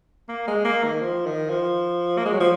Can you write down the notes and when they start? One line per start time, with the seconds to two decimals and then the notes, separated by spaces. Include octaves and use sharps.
0.29 A#3
0.47 G#3
0.65 A#3
0.84 D#3
1.02 F3
1.26 D#3
1.50 F3
2.18 A#3
2.25 G#3
2.33 F#3
2.40 F3